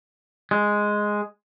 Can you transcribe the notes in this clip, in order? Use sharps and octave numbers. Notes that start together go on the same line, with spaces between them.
G#3